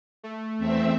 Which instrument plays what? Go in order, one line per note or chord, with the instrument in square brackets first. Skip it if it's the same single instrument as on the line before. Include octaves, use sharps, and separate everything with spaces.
[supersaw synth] A3
[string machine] E2 C4 E5